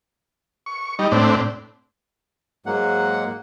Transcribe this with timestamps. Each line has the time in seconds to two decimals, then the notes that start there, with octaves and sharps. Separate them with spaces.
0.66 C#6
0.99 G3 D#4
1.12 A2 C4 D4
2.66 G#2 F#3 G#3 A#3 F#5